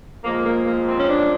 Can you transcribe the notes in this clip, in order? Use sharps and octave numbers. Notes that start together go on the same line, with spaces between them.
A#2 F3 G#3 A#3
A#3
A#3
C4
C#4
D4